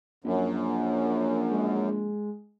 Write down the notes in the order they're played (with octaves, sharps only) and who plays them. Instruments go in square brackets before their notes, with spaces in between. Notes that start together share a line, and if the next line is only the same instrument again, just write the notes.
[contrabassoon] A#1 [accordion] F#2
[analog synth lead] G#3